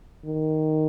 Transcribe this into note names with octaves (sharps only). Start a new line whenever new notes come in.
D#3